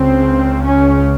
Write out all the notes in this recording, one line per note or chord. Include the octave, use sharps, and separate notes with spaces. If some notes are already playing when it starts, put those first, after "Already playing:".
Already playing: C#2 C#3 C4
C#4